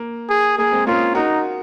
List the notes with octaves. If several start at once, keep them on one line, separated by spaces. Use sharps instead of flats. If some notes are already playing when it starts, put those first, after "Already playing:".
Already playing: A#3
G#4
A#3 G#4
G#3 C4
A#3 C#4 F4
D#4 F#4 A#4